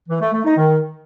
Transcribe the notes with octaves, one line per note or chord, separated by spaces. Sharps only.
E3
A3
A3
D#4
D#3